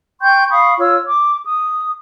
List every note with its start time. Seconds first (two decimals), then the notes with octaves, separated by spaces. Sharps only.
0.20 G5 C6 C#6 G6
0.50 F5 B5 C#6 D#6
0.78 F4 C#5 E6
1.07 D6
1.44 D#6